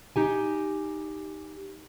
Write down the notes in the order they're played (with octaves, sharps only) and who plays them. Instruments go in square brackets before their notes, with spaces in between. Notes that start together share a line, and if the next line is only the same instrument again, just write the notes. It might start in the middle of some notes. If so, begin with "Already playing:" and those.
[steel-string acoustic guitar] D#4 G4 G#5